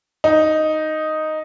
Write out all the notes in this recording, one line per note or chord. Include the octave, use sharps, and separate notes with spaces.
D#4